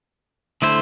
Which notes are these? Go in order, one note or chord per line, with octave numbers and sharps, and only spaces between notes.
D3 A3 E4 C5